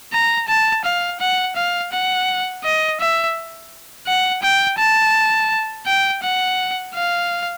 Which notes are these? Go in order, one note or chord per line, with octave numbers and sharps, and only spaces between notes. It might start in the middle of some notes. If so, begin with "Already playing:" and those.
A#5
A5
F5
F#5
F5
F#5
D#5
E5
F#5
G5
A5
G5
F#5
F5